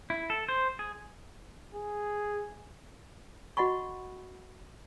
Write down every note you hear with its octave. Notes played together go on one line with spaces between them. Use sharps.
E4
A4
C5
G#4
G#4
F#4 D#5 F#5 B5 C#6